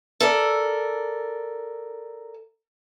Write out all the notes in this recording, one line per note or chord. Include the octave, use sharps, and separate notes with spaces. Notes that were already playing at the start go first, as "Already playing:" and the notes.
A4 A#4 D5